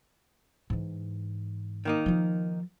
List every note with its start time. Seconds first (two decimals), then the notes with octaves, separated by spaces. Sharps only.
0.70 G#2 E3
1.85 D#3 A#3 D#4
2.06 F3 F4